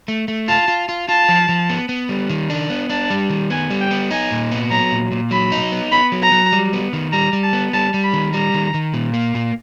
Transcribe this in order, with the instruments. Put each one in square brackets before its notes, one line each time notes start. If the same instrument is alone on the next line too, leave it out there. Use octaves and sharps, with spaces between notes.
[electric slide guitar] A3
A3
[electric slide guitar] F4 [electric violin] A5
[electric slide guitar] F4
F4
[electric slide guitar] F4 [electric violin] A5
[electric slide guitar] F3
F3
B3
B3
G3
D#3
D4
B3
[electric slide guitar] D4 [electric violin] A5
[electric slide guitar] G3
D#3
[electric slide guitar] B3 [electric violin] G#5
[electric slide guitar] G3
[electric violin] G5
[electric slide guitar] B3
[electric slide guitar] D#4 [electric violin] G#5
[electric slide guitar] A#2
B3
[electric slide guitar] F#3 [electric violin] A#5
[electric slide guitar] A#2
A#2
[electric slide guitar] F#3 [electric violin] B5
[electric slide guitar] D#4
B3
[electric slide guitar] B3 [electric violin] B5
[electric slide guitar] F#3
[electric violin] A#5
[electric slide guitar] F#3
G3
B3
D#3
[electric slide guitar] G3 [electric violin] A#5
[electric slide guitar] G3
[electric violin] A5
[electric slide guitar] B3
[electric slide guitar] G3 [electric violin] A5
[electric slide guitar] G3
[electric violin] B5
[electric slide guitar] D#3
[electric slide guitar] G3 [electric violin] A#5
[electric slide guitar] D#3
D#3
A#2
A#3
A#2